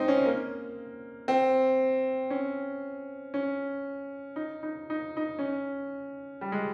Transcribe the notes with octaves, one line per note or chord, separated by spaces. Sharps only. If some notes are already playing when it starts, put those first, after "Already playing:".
Already playing: G#3 C4 D#4
C#4
A#3
C4
C#4
C#4
D#4
D#4
D#4
D#4
C#4
G3
G#3